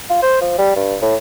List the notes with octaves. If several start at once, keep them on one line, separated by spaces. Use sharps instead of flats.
F4
C5
F3
G3
G2
A2